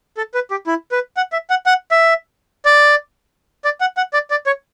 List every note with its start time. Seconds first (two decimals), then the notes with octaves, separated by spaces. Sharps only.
0.17 A4
0.34 B4
0.51 G4
0.67 E4
0.92 B4
1.17 F#5
1.32 E5
1.50 F#5
1.66 F#5
1.91 E5
2.65 D5
3.65 D5
3.81 F#5
3.97 F#5
4.13 D5
4.31 D5
4.46 C#5